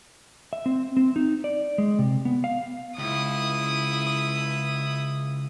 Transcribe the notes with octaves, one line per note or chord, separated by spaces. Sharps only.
E5
C4
C4
D#4
D5
G#3
C3
B3
F5
C#2 E4 D#6